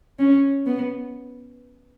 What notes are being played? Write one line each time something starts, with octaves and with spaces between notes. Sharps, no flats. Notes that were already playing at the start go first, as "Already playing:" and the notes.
C#4
B3